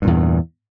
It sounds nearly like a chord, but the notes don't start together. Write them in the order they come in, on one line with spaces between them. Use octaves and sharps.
G2 A#2 E2